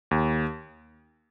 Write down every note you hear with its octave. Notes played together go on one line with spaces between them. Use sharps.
D#2